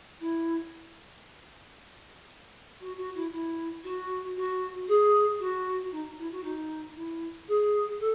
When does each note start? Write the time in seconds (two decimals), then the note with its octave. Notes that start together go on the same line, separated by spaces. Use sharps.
0.20 E4
2.80 F#4
2.97 F#4
3.15 E4
3.31 E4
3.83 F#4
4.36 F#4
4.88 G#4
5.39 F#4
5.91 D#4
6.18 E4
6.31 F#4
6.43 D#4
6.95 E4
7.48 G#4
7.99 A4